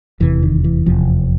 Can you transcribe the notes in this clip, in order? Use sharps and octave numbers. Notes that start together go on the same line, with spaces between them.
F1 E2 C3 E3
D#3
E3
F1 E2 C3 F3